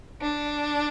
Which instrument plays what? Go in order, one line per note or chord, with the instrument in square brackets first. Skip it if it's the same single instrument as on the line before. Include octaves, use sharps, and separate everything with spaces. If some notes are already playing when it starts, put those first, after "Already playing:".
[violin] D4